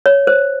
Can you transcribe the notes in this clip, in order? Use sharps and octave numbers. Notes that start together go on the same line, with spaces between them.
C#5
C5